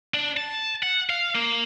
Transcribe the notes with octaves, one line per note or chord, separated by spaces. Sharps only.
D4
A5
F#5
F5
A#3